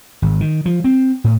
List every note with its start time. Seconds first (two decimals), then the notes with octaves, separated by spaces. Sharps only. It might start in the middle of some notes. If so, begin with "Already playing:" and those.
0.22 G#1
0.41 D#3
0.66 F3
0.84 C4
1.24 A2